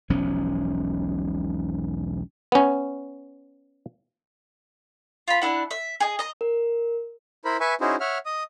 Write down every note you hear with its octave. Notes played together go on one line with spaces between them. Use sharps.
E1 B1 F3 C#4
B3 C#4
F4 B5
D4 E4 F#5
E5
G#4 D#5
D#5 A#5
A#4
E4 A#4 C5 B5
B4 E5 G#5 C#6
C#4 D#4 E4 F#4 G#4 C5
C#5 E5 F#5 F6
D#5 D#6